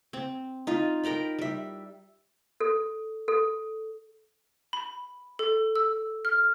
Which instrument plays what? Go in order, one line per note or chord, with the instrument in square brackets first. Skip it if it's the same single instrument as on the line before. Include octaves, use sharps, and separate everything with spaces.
[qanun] C4
D#4 F4
A#4 G5 A#5 B5
G3 E5
[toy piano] A4
A4
[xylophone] B5
A4
E6
F6